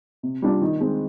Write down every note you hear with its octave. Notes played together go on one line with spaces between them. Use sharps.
C3
G3 D4 F4
D#3
G#3 C4